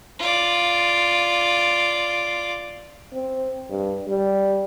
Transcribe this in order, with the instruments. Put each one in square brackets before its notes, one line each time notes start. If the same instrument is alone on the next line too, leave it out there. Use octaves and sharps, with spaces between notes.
[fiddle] F4 D5
[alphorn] C4
G2
G3